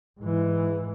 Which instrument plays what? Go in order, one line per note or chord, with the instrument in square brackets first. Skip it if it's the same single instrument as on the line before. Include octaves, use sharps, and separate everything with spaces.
[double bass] G#2 E3